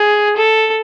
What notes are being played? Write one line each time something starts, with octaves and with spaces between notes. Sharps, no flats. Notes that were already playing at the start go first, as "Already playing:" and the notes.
Already playing: G#4
A4